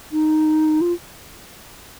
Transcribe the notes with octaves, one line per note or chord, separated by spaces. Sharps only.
D#4
F4